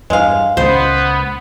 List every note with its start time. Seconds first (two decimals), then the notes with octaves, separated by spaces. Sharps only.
0.10 E2 G2 G#3 F5
0.57 C#2 A#2 B3 C5